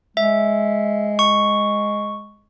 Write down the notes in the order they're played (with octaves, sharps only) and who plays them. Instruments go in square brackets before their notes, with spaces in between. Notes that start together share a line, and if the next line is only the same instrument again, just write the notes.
[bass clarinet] G#3 [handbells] E5
[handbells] C#6